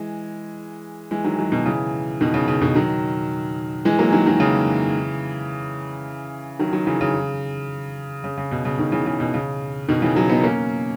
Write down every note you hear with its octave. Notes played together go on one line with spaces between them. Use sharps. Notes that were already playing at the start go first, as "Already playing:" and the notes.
Already playing: E3 G#3
E3 G#3
D#3 F#3
D#3 F#3
B2 D#3
C#3 E3
B2 D#3
C#3
C#3
B2 D#3
D#3 F#3
E3 G#3
F#3 A#3
D#3 F#3
D#3 F#3
C#3 E3
D#3 F#3
D#3 F#3
C#3 E3
C#3
C#3
C#3
B2
C#3
B2 D#3
C#3 E3
C#3
B2
C#3
B2 D#3
C#3 E3
D#3 F#3
B3 D#4
A#3 C#4